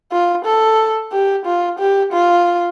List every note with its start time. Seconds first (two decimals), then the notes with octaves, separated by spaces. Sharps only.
0.12 F4
0.45 A4
1.12 G4
1.46 F4
1.79 G4
2.13 F4